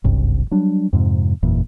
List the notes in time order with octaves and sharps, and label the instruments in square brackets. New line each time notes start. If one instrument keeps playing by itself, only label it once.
[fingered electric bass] F#1 C2 G2
F#3 G3 D4
F2 G#2 C3
F#1 E2 A#2